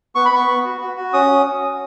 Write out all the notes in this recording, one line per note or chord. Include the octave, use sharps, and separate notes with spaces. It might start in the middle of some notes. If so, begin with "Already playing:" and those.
B3 C#6
B5
B3 C#6
B3
F#4
F#4
F#4
C#4 D#6